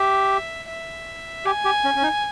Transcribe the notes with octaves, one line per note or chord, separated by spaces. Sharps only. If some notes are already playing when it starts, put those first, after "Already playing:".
Already playing: G4 E5
E5
G4 G#5
G4
C#4
C#4
D#4